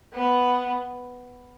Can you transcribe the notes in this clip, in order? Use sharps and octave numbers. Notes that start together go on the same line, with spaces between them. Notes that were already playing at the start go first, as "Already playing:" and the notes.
B3